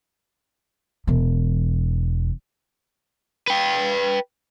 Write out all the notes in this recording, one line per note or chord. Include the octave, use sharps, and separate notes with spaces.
E1 E3
B4 G5